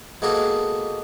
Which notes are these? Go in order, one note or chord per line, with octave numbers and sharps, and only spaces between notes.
B2 G#3 A#3 F#4 G#4 A4